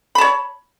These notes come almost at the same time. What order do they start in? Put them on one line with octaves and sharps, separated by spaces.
B5 A5 C#5